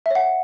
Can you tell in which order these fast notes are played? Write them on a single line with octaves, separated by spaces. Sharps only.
E5 C#5 F#5